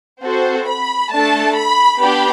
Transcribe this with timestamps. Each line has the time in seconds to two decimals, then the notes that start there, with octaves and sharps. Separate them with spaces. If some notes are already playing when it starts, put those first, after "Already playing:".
0.24 C4 F#4 A4 C5
0.69 B5
1.13 A3 D4 A4 A5
1.56 B5
2.01 B3 D4 G4 B5